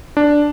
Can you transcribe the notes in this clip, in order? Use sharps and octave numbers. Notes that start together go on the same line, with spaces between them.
D4